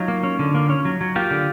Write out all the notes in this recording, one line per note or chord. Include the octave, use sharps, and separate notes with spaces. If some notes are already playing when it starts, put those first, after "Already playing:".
Already playing: F#3 D#4 F4
A#3
C#4
D3
A#3
C#4
F#3
F#3
A#3 F4 G4
D3